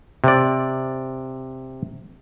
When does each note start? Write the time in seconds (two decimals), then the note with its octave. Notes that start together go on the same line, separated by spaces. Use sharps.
0.24 C3 D5